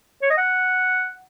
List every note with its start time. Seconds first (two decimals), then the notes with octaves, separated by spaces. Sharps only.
0.22 C#5
0.30 D#5
0.38 F#5